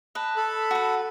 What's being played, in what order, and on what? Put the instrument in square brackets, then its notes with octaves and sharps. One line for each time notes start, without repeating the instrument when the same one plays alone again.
[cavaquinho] B4 D#5 [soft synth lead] A5
[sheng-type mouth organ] A4 B5
[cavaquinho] F#4 B4